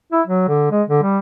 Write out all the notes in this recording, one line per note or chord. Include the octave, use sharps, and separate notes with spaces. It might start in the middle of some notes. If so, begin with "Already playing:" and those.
E4
F#3
D3
G#3
D3
G3